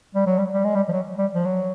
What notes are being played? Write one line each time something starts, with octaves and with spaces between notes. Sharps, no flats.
G3
F#3
G3
G3
G#3
G3
F3
F#3
G3
F3
F#3